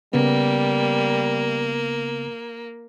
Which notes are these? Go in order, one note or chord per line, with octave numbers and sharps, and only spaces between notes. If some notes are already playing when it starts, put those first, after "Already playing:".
C#3 G3 A#3 B3